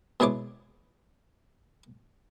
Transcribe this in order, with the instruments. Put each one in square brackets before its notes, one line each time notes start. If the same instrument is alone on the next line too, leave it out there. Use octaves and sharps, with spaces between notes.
[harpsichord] B2 G#3 E4 C#5 D6